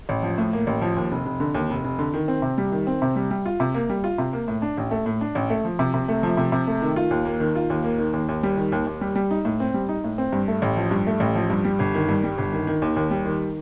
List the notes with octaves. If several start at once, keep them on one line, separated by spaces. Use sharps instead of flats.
A1
F3
A2
A#3
A1
F3
D#2
F1
F1
D3
D#2
F1
F1
D3
D#3
C4
C3
G3
D#3
C4
C3
G3
G3
F4
C3
A#3
G3
F4
C3
A#3
A2
D4
A1
A3
A2
D4
A1
A3
F3
C3
C3
A3
F3
C3
C3
A3
D#3
F4
D#2
A#3
D#3
F4
D#2
A#3
D#3
D#2
D#2
G3
D#3
D#2
D#2
G3
G3
D#4
A2
C4
G3
D#4
A2
C4
G2
A3
A1
F3
G2
A3
A1
F3
G2
G3
G1
D#3
G2
G3
G1
D#3
D#3
D#2
D#2
G3
D#3